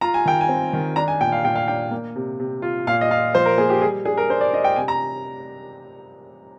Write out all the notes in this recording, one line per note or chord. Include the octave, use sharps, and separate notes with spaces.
F4 A#5
G#5
D#3 G5
G#5
C4
D#3
D4 A#5
G#5
A#2 G5
F5
A#2 G5
F5
D4 G5
A#3
C3
C3
F4
A#2 F5
D#5
F4 F5
F3 C5
A#4
A#3 G#4
G4
G3 G#4
D4 G#4
A#4
D4 C5
D5
D4 D#5
G5
C3 G#5
A#5